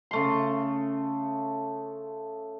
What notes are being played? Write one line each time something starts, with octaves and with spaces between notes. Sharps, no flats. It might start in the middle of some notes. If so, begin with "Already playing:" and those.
C#3 A3 C6